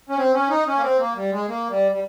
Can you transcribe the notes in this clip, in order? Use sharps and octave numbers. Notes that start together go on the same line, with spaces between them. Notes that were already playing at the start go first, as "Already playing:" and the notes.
C#4
C4
C#4
D#4
C#4
A#3
C4
A#3
G3
G#3
A#3
G3
G3